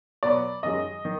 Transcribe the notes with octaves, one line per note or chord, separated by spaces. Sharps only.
B2 F#3 B3 D5
F#2 D#3 G#3 D#5
D#3